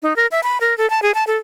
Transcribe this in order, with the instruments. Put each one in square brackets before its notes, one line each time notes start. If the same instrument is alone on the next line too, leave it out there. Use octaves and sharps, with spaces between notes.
[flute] D#4
A#4
E5
B5
A#4
A4
A5
G#4
A5
A4